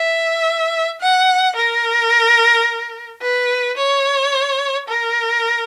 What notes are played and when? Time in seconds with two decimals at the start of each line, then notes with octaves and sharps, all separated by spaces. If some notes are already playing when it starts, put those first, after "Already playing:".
Already playing: E5
1.01 F#5
1.56 A#4
3.22 B4
3.77 C#5
4.88 A#4